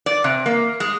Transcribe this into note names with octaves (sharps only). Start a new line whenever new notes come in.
D5
C3
A#3
G#3